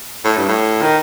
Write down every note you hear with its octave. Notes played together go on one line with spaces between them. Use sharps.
A2
G2
A2
D#3